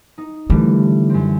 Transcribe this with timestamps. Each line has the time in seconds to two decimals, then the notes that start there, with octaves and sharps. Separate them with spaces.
0.18 D#4
0.50 D3 E3 G3 A3
1.10 F#2 C4